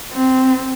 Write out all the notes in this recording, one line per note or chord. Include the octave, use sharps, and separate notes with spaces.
C4